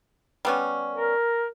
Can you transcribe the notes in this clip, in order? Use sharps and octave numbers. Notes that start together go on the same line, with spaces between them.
G3 B3 C#4
A#4